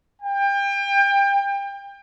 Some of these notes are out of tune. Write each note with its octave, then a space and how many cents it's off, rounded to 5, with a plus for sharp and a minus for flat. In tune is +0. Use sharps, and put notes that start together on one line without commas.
G5 +30